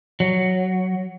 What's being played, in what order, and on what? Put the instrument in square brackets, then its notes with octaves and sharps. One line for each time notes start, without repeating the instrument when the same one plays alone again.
[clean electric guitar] F#3